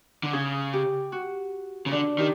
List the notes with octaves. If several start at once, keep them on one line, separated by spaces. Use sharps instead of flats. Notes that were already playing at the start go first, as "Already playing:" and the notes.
D3
C#3 G#4
G4
F#4
C#3
D3 D4
D#3 G4